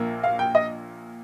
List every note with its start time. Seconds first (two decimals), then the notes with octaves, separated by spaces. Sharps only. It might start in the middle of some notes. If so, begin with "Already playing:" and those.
Already playing: A#1 A#2 A#3
0.23 F5
0.39 G5
0.55 D#5